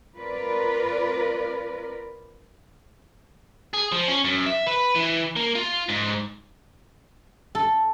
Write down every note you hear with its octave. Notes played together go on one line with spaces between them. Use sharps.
C4 F4 A#4 B4 D5
G#4
F3
C#4
F#2
E5
B4
E3
A#3
F4
G#2
A4